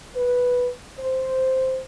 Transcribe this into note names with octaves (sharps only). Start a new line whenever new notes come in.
B4
C5